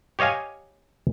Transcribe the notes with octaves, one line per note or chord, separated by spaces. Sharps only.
G4 C#5 D#5 F5 G#5